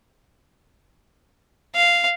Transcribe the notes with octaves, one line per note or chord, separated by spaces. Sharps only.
F5